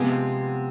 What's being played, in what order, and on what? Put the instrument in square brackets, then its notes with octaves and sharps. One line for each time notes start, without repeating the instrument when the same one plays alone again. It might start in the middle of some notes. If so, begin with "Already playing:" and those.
Already playing: [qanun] C3 F3 G#3 C4 [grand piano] B3